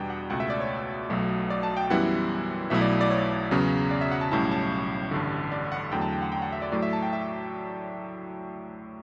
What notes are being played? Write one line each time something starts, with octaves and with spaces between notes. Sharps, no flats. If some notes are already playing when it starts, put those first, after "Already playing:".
Already playing: E2 B2 G3 D4 G5
F#5
C#2 B2 A3 F#5
E5
D5
C#5
B1 B2 F#3 A3
D5
A5
G5
F#2 E3 G3 B3 E4 F#5
B1 B2 F#3 A3 E4 E5
D5
D5
C#5
E2 C#3 F#3 B3
D5
E5
F#5
A5
B1 A2 G3 C#4 E4 A5
A5
A1 G2 D3
D5
F#5
E2 D3 F#3 A3 G5
A5
G5
F#5
G5
F#5
E5
D5
A2 F#3 A3 D5
E5
A5
G5
E5